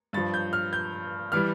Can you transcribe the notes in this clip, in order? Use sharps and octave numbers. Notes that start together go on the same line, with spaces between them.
G2 F3 A6
G6
F6
G6
E3 G3 F6